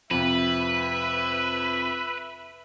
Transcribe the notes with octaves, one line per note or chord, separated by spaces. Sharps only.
F2 C3 B4 E5